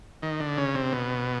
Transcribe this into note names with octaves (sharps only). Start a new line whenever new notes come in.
D#3
D3
C#3
C3
B2